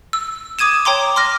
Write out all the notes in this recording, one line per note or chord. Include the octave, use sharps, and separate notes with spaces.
E6
D6 D#6 G#6 D#7 E7
C#5 G5 A#5 C6 D6
C6 D6 F6 A#6